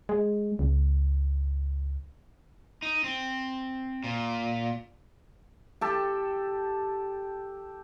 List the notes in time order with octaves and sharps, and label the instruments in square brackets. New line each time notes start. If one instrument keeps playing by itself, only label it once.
[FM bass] G#3
C#2
[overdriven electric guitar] D#4
C4
A#2
[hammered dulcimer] G4 A4